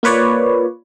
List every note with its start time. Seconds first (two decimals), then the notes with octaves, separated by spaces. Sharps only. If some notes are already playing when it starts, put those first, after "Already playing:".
0.03 A#3 F4 B4 C#5 D5